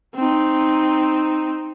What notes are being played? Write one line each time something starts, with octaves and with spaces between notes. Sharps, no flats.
C4 D#4